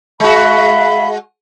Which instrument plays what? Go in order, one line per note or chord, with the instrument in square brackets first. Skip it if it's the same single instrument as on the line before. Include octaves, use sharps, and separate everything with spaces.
[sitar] G#3 F#4 [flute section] E5 F5 B5